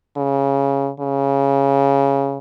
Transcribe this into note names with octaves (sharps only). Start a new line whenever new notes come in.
C#3
C#3